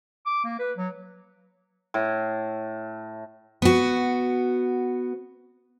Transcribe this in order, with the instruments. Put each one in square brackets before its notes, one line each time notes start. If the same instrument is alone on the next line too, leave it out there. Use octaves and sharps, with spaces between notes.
[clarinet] D6
A#3
B4
F#3
[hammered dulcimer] A2
[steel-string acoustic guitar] B3 F#4